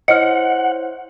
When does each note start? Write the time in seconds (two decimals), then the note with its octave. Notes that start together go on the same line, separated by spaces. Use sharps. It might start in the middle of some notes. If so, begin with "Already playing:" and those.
0.08 E4 C5 C#5 D#5 F#5 F6